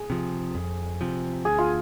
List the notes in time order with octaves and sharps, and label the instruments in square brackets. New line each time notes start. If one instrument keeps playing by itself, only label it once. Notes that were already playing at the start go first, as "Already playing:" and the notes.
Already playing: [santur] G#4
[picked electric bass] C3 F3
F2
C3 F3
[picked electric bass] D2 [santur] G#4
[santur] F4